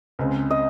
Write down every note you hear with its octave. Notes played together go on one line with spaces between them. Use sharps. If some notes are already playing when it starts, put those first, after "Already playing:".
C#2 C#3 G#3 C4
D#5